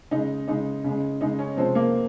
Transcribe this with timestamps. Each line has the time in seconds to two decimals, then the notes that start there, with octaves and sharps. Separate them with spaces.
0.11 C#3 G#3 D#4
0.48 C#3 G#3 D#4
0.84 C#3 G#3
1.21 C#3 G#3 D#4
1.39 C#4
1.57 C3 F3 G#3 C4
1.75 A#3